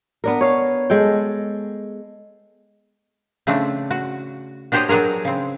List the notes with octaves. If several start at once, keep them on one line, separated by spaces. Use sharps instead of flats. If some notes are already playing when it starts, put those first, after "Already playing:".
B3 D4 A#4
C#5 F5
G#3 A4 G5
C#3 A3 C4 D4
F#4
D4 F#4 G4 C5 C#5 D#5
F#3 D4 F#4 G#4 A#4
C#3 C4